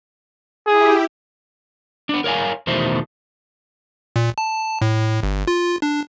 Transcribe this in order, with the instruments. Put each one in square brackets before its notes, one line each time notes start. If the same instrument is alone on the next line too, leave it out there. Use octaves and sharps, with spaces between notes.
[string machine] E4 G4 [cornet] G#4
[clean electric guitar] B3 D4
A#4 C#5 F5 G#5
E2 B2 D#3 A3 C5
[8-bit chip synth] A#2
A5
A2
G1
F4
D4